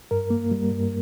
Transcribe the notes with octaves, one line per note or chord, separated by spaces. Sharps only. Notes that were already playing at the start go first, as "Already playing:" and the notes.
G2 A#4
A#3
G3
G2